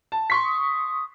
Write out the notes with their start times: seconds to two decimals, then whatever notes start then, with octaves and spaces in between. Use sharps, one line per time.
0.12 A5
0.30 C6 C#6 B6
0.44 D#6